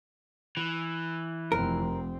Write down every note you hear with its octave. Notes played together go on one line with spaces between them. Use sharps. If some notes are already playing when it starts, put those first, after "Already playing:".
E3
F1 C4 A#4